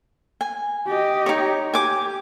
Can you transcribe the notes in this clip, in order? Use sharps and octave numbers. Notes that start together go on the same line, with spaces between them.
G#5
G4 D#5
D#4 C#5
G4 G#5 D6